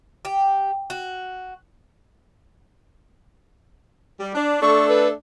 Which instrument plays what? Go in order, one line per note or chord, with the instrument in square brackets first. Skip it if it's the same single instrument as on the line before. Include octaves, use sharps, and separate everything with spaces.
[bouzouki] G4
F#4
[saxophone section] G3
D4
[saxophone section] A3 D4 A4 [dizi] C#6
[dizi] B4